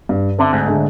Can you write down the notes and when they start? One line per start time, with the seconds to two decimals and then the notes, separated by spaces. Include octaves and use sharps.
0.09 G2
0.39 D3 C4 E5
0.53 D2 G#2
0.66 D3 G#3 A3